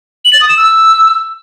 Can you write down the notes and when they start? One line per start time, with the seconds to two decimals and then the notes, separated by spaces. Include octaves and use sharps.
0.25 F#7
0.33 A6
0.41 D#6
0.49 E7
0.57 E6